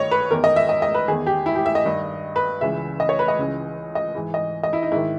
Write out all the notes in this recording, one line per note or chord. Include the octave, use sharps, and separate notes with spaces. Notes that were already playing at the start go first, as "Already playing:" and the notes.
Already playing: G2 D#3 C#5 D#5
B4
E2 D#3 A#4
D#5
E5
D#5
D#5
B4
E2 D#3 G#4
G4
E4
G4
E5
D#5
G2 D#3
B4
C#2 C#3 E3 E5
D#5
C#5
B4
D#5
C#2 C#3 E3
D#5
G#2 E3
D#5
D#5
E4
D#4
G#2 D#3 E4